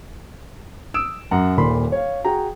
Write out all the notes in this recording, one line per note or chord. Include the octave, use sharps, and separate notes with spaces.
D#6 E6 D7 E7
F#2 F#5 A#5
D#1 A#2 B5 C6
C#5 F5
F#4 G#4 G5 A#5